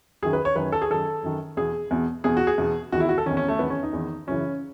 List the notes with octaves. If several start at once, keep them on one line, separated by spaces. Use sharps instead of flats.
F#2 D#3 G#4
B4
C#5
F#2 D#3 B4
A4
G#4
F#2 D#3 A4
F#2 D#3
E2 B2 G#4
E2 B2
E2 B2 G#4
F#4
G#4
E2 B2
E2 D#3 F#4
E4
F#4
A4
E2 D#3 C#4
C#4
A3
E2 D#3 B3
C#4
D#4
E2 D#3
F#2 C#3 E3 C#4